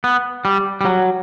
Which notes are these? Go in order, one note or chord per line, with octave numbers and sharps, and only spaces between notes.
B3
G3
G3
F#3